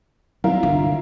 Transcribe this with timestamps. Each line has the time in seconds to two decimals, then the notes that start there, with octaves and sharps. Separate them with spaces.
0.44 F#3 C4 E4 F4 A#4
0.63 G2 D3